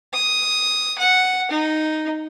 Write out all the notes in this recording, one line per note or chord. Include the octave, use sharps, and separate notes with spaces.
D#6
F#5
D#4